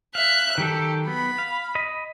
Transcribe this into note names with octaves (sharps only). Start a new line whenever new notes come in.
E5 F5 F#6
D#3 F#3 G4 A4
B3 B5
F5
D#5 B5